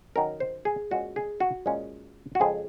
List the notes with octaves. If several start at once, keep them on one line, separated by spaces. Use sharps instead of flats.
D#3 F#3 C#4 A#4
C5
G#4
A#2 G#3 C#4 F#4
G#4
F#4
A#2 G#3 C#4
F#4
F2 C#3 F3 G#3 C4 G#4